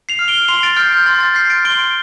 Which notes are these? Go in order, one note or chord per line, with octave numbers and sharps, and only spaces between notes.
C7 F7
F6
D7 G7
C6 C7 F7
A6 D7
F6 G6 C7
G6
C6 A6
A6
F6 G6 C7
A6 D7
C6 D7 G7